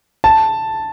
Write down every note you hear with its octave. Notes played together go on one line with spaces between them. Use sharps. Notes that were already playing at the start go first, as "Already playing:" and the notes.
A5